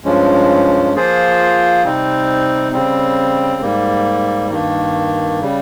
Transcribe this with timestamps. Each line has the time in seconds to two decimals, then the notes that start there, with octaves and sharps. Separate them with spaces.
0.05 G2 F3 G#3 C#4
0.94 F3 A#3 F4 G#4 C5
1.84 C3 G3 C4 D#4
2.72 C#3 G3 C4
3.61 G#2 G3 A#3
4.50 G2 D#3 A#3
5.41 C#3 G3